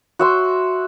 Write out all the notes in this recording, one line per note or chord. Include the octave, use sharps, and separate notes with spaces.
F#4 E5 C6